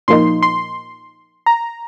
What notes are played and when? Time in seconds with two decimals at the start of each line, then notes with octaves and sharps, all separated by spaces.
0.08 A#2 F3 A#3 D#4 C6
0.43 C6
1.46 A#5